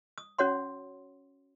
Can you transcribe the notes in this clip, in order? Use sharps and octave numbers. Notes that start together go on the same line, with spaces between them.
D#6
C#4 F#4 C#5 F#5 C6